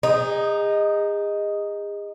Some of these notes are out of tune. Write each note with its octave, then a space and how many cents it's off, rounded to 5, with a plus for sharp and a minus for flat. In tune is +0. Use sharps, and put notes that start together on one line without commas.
D#4 +0 G#4 -35